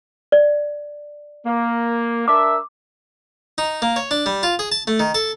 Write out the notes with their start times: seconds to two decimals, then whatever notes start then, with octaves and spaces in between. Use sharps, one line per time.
0.32 D5
1.46 A#3
2.28 D4 A#4 E5 D6
3.58 D#4
3.82 A#3
3.96 C#5
4.11 D4
4.26 G3
4.43 F4
4.59 G#4
4.72 A5
4.87 A3
5.00 D#3
5.15 A4